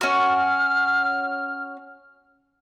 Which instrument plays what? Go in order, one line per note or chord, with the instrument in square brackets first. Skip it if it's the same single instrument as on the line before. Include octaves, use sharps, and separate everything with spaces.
[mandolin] C#4 F#4 [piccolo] F6